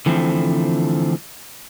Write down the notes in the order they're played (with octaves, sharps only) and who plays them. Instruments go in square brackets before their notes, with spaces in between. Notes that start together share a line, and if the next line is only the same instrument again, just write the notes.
[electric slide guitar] D3 E3 F3 A3 C4